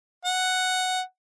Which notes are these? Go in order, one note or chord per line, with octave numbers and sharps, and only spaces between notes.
F#5